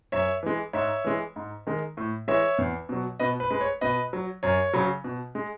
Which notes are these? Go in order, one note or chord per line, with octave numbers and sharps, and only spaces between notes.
F#2 C#5 E5
E3 G#3
G#2 C#5 E5
E3 G#3
G#2
D#3 G#3
A2
E3 G#3 C#5 E5
E2
B2 F#3
B2 B4 D#5
B4
G#3 B4
C#5
B2 B4 D#5
F#3
F#2 C#5
C#3 F#3
B2
G#3